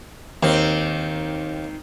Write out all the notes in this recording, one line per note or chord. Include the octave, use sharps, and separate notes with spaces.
D#2 D#3 C4